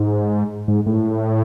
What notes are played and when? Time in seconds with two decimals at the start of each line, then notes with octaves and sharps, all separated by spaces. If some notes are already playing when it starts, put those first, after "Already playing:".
Already playing: G#2
0.68 G#2
0.86 A2